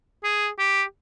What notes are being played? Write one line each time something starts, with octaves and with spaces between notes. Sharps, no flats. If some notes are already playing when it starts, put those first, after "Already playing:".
G#4
G4